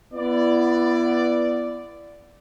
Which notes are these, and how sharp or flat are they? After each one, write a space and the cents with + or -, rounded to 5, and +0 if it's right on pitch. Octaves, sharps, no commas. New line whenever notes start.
B3 +0 E4 +35 D5 +0